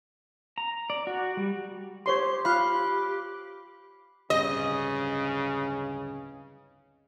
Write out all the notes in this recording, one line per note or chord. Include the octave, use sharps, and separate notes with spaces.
A#5
D5
F#4
G3
G4 C5 C#5 C6
F4 F5 B5 F#6
D1 G2 C#3 C4 D#5